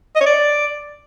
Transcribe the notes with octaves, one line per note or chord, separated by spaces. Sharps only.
D#5
C#5
D5